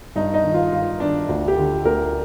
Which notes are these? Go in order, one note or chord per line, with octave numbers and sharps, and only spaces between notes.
G2 D#4
D#4
D#3
F4
G2 F4
D#3 D4
D2
G4
D3
D2 A#4